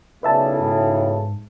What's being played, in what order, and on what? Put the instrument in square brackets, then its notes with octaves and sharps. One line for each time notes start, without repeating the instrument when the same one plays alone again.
[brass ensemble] B1 A2 C#3 [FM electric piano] B4 E5 A5 [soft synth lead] D5
[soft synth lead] G#2